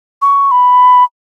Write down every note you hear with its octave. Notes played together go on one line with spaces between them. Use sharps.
C#6
B5